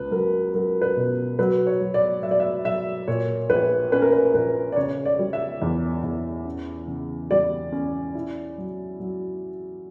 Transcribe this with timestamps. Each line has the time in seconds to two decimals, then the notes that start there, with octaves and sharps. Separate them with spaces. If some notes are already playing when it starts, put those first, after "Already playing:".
Already playing: C#2 B4
0.11 F#3 A#4
0.54 F#3 A#4
0.82 B4
0.97 B2
1.39 F#3 B4
1.67 C#5
1.81 F#3
1.94 D5
2.23 F#3 E5
2.31 D5
2.40 E5
2.65 F#3 E5
3.08 A#2 C#5
3.50 A#1 B4
3.92 C#4 B4
4.02 A#4
4.12 B4
4.34 A#1 B4
4.72 D5
4.76 C#3 C#5
5.05 D5
5.19 G3
5.33 E5
5.62 E2
6.03 E2
6.45 C#4
6.88 C#3
7.31 G3 D5
7.72 C#4
8.15 E4
8.58 F#3
9.00 F#3